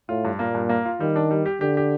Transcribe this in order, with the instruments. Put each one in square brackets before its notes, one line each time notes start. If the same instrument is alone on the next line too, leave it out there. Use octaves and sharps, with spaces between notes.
[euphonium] A2 [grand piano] F4
[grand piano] G2
[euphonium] A#2 [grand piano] A#3
[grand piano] G2
A#3
F4
[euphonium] D#3 [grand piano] G3
[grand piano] D4
G3
G4
[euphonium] D3 [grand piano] G4
[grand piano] G4